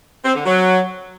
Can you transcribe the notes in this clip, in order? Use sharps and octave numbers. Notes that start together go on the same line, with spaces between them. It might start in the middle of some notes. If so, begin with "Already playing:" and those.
C4
D3
F#3